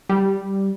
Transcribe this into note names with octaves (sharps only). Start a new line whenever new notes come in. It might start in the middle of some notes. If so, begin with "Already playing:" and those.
G3